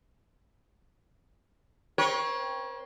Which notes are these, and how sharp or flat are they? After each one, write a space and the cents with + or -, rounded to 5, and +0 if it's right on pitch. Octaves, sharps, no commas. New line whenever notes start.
C4 +5 A#4 +45 C#5 +0